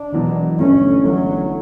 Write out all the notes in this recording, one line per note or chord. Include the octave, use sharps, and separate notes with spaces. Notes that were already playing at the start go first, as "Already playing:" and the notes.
Already playing: D4
E1 E2 B2 F#3
G1 G2 E3 A3 C#4
G1 G2 E3 F#3 A3